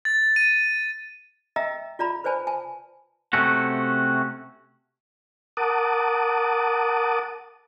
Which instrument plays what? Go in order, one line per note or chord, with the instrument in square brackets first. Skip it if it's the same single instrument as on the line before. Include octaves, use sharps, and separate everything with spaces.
[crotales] A6
D#7
[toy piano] D#5 E5 G5 A#5 E6
F4 D5 A#5 B5
B4 C5 D5 G#5 A5 B5
G#5 A5
[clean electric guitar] C3 A3 C#4 F#4
[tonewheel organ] A#4 F#5 A5 D6 D#6